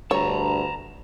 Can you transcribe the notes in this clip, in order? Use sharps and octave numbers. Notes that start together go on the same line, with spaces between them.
D2 G2 C#5 A5 A#5